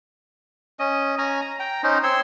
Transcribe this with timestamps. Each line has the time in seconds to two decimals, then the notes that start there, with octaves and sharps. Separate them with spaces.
0.79 C#4 D#5
1.18 C#4 G#5 A#5
1.42 A#5
1.60 G5 A#5
1.83 C#4 D#4 C5
2.03 C4 C#5 C6 E6